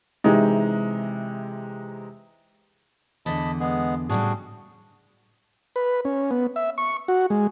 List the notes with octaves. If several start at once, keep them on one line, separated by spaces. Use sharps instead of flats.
C3 E3 G#3 D#4
E2 D3 D#5 A5 B5
G#3 B3 G#4
A2 C#3 G3 D4 F#4 G#4
B4
C#4
B3
E5
C#6
F#4
G#3